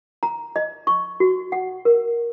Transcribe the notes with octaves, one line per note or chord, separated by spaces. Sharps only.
A#5
D#5
C#6
F#4
F#5
A#4